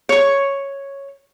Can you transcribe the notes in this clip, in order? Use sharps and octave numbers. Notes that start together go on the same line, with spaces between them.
C#5 C#6